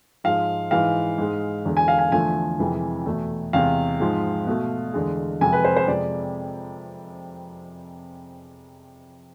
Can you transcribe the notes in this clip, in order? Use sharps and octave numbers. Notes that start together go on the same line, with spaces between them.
G#2 F3 G#3 F5
G#2 E3 G#3 F5
G#2 G#3
E2 D3 G#3
G#5
F5
G#5
E2 D3 F3 A3 G#5
F2 C3 E3 G#3
E2 B2 A3
E2 C3 G#3 F5
G#2 F3 G#3
B2 A3
E2 D3 G#3
F2 C3 G#3 G#5
B4
C5
C5
F2 C3 G#3 D5